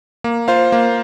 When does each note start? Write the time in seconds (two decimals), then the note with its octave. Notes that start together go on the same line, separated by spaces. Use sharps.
0.24 A#3
0.48 F4 C5 F5
0.72 A#3